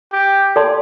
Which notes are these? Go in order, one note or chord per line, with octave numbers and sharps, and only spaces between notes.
G4
A4 D5 A5 C6